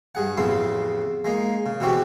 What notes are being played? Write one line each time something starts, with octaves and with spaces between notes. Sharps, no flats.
G2 G#4 F#5
A1 F2 C#3 B3 E4 C6
G#3 A#3 D#4
C#3
B2 E3 B3 C4 F#4 G4